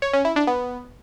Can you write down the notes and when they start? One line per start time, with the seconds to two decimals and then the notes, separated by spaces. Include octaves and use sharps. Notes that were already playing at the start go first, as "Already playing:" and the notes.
0.02 C#5
0.13 C#4
0.25 E4
0.36 D4
0.47 B3